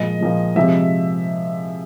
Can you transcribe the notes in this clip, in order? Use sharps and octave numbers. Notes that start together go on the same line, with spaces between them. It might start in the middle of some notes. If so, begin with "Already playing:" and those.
Already playing: A#2 F3 G#3 D#5
A#2 F3 G#3
C3 F3 G#3 E5